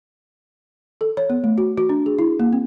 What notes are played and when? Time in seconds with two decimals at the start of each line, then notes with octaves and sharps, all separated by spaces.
1.01 A4
1.17 C#5
1.30 B3
1.44 A3
1.58 F#4
1.77 F#4
1.89 D4
2.06 G#4
2.19 E4
2.40 A#3
2.53 C4